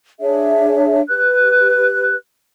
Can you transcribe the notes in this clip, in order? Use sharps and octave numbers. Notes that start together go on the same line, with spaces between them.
D4 G#4 C#5 E5
G4 B4 F#6